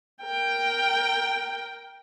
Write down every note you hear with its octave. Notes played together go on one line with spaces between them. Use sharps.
A#4 G5